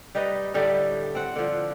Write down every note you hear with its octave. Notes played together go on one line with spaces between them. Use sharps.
G3 D#4 B4 D#5
A2 D3 G3 A3
C4 F#5
D3 F3